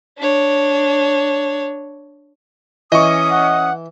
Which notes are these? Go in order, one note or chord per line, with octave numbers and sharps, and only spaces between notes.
D4 C#5
E3 C#4 D#5 C#6 D#6
F#5